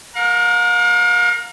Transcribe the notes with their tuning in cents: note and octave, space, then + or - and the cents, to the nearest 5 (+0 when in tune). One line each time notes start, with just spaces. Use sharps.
A#4 +0 F5 +45